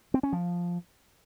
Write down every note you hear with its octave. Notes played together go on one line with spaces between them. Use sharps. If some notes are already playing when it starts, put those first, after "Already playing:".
C4
C#4
F3